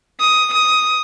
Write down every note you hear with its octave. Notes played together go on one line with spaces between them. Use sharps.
D#6
D#6